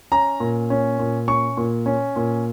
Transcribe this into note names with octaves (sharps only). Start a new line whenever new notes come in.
C#4 A#5
A#2
C#4
A#2
C#4 C#6
A#2
C#4
A#2